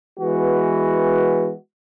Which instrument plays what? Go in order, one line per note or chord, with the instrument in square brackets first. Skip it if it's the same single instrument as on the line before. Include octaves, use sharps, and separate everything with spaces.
[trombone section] E3 G#3 B3 F#4